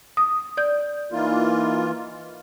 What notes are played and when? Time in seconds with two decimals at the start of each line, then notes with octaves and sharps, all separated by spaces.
0.17 D#6
0.57 D5 G6
1.12 E3 A#3 D#4 F4